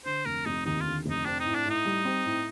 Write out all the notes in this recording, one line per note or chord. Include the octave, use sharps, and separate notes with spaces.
D3 C5
F1 A#4
F1 D#4
D#2 D#4
D3 F4
F1 D#4
C4 D4
D#4
A2
D4
A2
D#4
G3
C4
A2